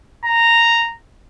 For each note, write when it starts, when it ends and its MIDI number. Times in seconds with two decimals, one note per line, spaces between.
0.25 0.91 82